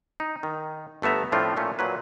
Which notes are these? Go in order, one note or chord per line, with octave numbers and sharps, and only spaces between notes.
D#4
D#3
G1 A3 B3 E5 A#5
A2 F3 A3 C4 D4 F4
A#2 A3 C#4
A#2 F#3 B4